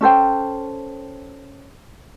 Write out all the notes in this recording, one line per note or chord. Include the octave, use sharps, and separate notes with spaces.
C#4 A4 C5 G5